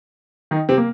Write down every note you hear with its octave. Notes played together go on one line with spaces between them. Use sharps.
D#3 D#4
C3 C4
A#3